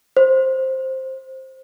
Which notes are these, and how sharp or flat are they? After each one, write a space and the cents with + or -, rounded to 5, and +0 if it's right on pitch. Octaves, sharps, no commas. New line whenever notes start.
C5 +5